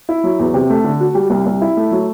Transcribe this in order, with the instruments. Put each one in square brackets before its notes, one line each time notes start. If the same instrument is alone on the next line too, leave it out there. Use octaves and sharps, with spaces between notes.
[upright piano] E4
F#3
E2
C3
A3
D3
F#4
G3
C2
C2
E4
A3
F#3